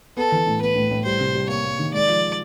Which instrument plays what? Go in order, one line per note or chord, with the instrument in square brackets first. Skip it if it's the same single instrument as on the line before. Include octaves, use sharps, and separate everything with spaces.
[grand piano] B3 [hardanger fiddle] A4
[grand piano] E3
A2
[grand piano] B3 [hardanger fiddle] B4
[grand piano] A2
A2
[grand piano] G3 [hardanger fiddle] C5
[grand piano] C3
G3
[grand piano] A#3 [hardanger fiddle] C#5
[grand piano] A#3
D#3
[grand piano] G#3 [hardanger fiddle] D5
[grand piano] F3